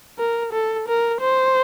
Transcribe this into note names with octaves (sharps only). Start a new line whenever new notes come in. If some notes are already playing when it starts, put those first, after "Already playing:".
A#4
A4
A#4
C5